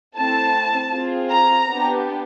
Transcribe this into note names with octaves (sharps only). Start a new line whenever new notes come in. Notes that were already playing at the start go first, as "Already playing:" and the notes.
A3 C4 E4 A5
C4 F4 G#4
A#5
B3 D4 G4